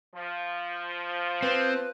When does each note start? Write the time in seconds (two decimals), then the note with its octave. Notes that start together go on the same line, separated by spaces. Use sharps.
0.16 F3
1.42 C4 B4